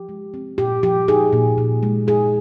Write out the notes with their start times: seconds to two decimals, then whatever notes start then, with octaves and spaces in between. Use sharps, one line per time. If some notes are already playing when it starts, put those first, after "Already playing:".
Already playing: F3 G4
0.09 G#3
0.34 C4
0.58 A#2 G4
0.83 F3 G4
1.08 D#4 G#4
1.33 A#2
1.58 A#2
1.83 G#3
2.07 D#4 G#4